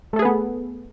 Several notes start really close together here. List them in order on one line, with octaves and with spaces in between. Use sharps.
A3 A4 G#4 B4 B3